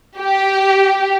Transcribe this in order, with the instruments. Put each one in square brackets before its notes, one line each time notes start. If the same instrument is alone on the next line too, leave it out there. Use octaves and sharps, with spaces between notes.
[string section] G4